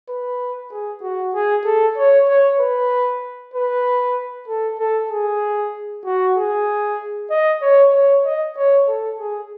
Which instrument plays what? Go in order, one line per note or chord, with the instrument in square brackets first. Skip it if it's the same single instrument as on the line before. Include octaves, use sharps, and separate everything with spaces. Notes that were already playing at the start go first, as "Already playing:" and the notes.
[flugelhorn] B4
G#4
F#4
G#4
A4
C#5
C#5
B4
B4
A4
A4
G#4
F#4
G#4
D#5
C#5
C#5
D#5
C#5
A4
G#4